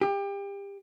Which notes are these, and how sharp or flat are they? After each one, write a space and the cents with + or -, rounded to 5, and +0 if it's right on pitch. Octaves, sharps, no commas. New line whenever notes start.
G4 +30